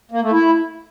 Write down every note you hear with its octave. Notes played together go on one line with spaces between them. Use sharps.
A#3
A3
E4